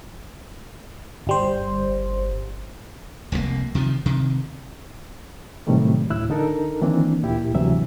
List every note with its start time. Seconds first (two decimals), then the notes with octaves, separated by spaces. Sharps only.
1.27 G1 G3 C5
3.32 F1 C2 A2 A#3
3.75 C3 D#3 F3
4.06 C3 D#3
5.67 A2 C3 D#3 F#3 G3 A3
6.10 D2 A2 E4 E6 F#6
6.30 D3 D#4 A4 A#4
6.81 D#3 E3 A#3 C4 D4
7.23 D2 A#2 E4 G4
7.55 D2 G2 C3 E3 F#3 E5